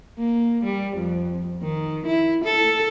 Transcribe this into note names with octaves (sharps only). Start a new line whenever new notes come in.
A#3
G3
F2
D#3
E4
A4